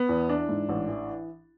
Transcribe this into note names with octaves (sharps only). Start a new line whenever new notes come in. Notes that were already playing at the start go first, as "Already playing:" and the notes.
Already playing: B3
E2
E3 D4
G#2
A1
E3